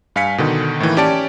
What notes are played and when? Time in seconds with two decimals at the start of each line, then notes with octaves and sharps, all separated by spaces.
0.16 G2 F5 G#5 B6 C#7
0.38 B2 D3 D#3
0.80 A2 D#3 E3 A#3
0.97 C#4 G4 D5 A5 D7